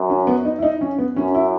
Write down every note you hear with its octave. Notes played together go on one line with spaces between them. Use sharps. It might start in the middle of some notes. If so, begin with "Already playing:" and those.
Already playing: F#2
C#4
B3
D#4
E4
D#4
C#4
B3
F#2 C#4
E4